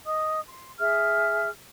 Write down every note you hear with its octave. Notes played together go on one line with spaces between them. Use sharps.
D#5 D#6
C6
G#4 E5 F6